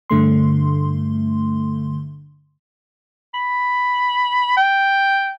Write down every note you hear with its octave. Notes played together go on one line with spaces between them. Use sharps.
G2 D3 A3 C6
B5
G5